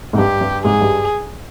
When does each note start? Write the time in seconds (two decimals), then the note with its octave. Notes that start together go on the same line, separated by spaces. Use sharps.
0.13 G#2
0.17 G2 G4
0.41 G2
0.65 G#2 G#4
0.81 G2